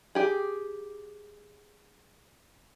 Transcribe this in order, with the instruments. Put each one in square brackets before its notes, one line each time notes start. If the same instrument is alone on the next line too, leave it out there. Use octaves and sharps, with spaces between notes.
[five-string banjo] G4 G#4